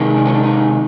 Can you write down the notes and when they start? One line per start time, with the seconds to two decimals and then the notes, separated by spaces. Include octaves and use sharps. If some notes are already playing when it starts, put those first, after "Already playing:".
Already playing: C3 D#3 G#3
0.16 D4
0.26 C#4
0.34 D4
0.43 D#4